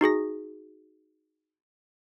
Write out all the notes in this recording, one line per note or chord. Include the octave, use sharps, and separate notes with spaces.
D#4 F#4 G#4 A#6